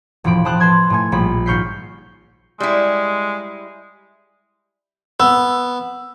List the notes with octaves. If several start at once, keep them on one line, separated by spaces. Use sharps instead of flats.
E1 A2 F3 B5 D7
G4 C5 A5 D#6 F#6
B4 A5 C6 G#6
A2 A3 G#5
A#1 G3 B5
G#1 C#6 F6 G6 B6 C7
G3 G#3 E4
B3 E6